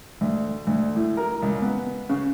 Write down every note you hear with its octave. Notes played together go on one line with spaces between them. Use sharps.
D2
D2
A2
A#4
C#2
B3
C#3